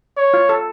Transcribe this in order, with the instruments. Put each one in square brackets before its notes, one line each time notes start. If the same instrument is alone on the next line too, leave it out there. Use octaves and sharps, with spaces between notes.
[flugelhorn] C#5
[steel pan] F4
A4